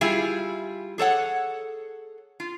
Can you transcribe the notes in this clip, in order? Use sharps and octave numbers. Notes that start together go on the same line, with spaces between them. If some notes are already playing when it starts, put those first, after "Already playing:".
G3 E4 F4 G#4
G#4 A4 C#5 F#5
F4